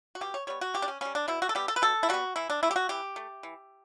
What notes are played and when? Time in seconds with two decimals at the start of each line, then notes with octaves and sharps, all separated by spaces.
0.15 F#4
0.21 B2 G4
0.34 C#5
0.47 G3 B3 C#5
0.61 F#4
0.74 B2 G4
0.82 D4
0.88 C#4
1.01 G3 B3 C#4
1.15 D4
1.28 B2 E4
1.42 F#4
1.49 A4
1.55 G3 B3 G4
1.68 A4
1.76 B4
1.82 B2 A4
2.03 E4
2.09 G3 B3 F#4
2.36 E3 E4
2.50 D4
2.63 A3 E4
2.71 G4
2.76 F#4
2.89 E3 G4
3.16 A3
3.43 E3